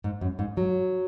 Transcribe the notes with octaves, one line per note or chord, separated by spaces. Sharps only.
G#2
F#2
G#2
F#3